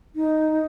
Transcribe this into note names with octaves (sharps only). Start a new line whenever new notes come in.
D#4